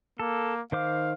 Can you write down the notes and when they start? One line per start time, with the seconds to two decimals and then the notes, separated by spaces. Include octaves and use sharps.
0.20 A#3 A4
0.72 D#3 C5 F5 D6